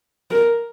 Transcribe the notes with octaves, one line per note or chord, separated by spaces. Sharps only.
A#4